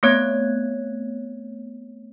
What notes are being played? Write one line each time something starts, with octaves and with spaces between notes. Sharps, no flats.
A3 B3 C4 C#5 F#6 G#6